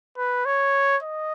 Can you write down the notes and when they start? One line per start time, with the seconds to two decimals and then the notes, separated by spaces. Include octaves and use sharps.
0.18 B4
0.46 C#5
1.03 D#5